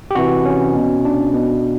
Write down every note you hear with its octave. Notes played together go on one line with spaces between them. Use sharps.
G4
C3 E3 F#4
C#4
B2
D4
B2